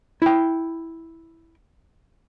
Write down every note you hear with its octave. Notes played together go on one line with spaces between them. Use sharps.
E4 G5